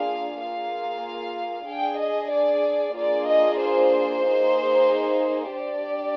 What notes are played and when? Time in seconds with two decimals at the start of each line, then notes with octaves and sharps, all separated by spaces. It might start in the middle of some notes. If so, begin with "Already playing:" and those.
Already playing: A#3 D4 F4 G#4 F5
0.41 A#3 F4 G#4 F5
1.69 D4 G#4 G5
2.01 D#5
2.33 D5
2.97 A#3 D4 F4 G#4 D5
3.29 D#5
3.61 C5
4.26 A#3 D#4 G#4
5.53 D4 G4 D5